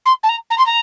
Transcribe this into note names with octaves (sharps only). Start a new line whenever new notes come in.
C6
A5
A#5
A#5
C6
A#5